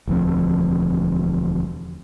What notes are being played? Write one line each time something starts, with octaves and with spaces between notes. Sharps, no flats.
E1 D2 F3 C4